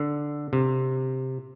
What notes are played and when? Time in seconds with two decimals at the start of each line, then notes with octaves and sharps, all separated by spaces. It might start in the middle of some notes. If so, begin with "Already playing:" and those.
Already playing: D3
0.53 C3